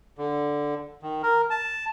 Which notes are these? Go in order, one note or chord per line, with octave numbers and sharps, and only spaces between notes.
D3
D#3
A#4
A5